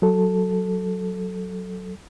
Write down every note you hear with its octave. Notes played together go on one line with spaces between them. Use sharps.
F#3 A4